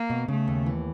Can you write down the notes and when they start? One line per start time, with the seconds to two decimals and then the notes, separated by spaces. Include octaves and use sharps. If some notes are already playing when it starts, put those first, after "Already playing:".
Already playing: A#3
0.10 B2
0.28 C#3 A3
0.48 D#2
0.66 E3